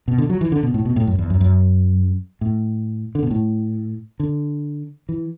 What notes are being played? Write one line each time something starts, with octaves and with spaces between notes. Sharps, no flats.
B2
D3
F#3
E3
D3
B2
A2
B2
A2
F#2
E2
F#2
F#2
A2
D3
B2
A2
D3
E3